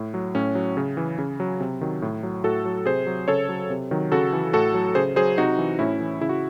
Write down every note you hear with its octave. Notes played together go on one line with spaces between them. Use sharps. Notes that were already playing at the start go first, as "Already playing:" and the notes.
Already playing: A2
F#3
A2 C#4
F#3
C#3
E3
C#3
F#3
C3
D#3 F#3
A2
F#3
A2 F#4 A4
F#3
C3 G#4 C5
F#3
C#3 A4 C#5
F#3
C3
D#3 F#3
C#3 F#4 A4
E3
A2 F#4 A4
F#3
C#3 G#4 C5
F#3 G#4 C5
C3 D#4 F#4
E3
A2 C#4 E4
E3
C#3 E4
F#4